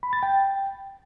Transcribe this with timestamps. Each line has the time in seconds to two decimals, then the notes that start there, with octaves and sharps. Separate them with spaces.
0.03 B5
0.13 A6
0.23 G5